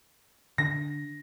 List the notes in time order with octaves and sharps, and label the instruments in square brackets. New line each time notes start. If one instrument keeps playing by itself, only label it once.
[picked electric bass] D3 D4 [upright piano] A#6